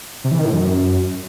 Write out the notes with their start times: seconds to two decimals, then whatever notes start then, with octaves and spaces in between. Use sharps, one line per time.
0.24 C3
0.31 E3
0.38 D#3
0.46 A2
0.53 F#2